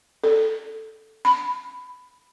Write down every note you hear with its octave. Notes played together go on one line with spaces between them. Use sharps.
A4
B5